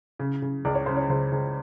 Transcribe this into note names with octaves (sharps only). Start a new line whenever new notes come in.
C#3
C#3
C#2 D5
C#5
C#3 C5
C#5
C#2 C5
C#2